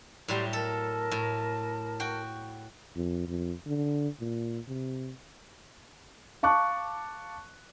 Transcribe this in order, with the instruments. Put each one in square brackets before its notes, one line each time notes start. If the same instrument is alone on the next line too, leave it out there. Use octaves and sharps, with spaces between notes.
[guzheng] A2 F#3 G3 [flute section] G4 D5 C6
[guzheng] A4 [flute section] A#4 A5
[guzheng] A2
F#4 G5
[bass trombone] F2
F2
D3
A#2
C3
[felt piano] F5 A5 C#6 D6 F#6